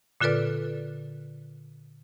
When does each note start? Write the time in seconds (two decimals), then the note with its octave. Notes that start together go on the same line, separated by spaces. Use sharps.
0.21 A#2 D3 F4 A4 B4 D5